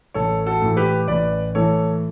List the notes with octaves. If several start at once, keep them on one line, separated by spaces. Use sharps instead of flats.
A1 A4 C#5
F#4 A4
A2 E3
G4 B4
A1 B4 D5
A2 E3 A4 C#5